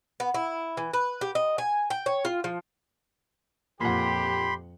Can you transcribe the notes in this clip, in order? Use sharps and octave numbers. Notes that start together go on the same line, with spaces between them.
B3
E4
E3
B4
G4
D#5
G#5
G5
C#5
F4
F3
F2 A#2 G4 F#5 B5 C6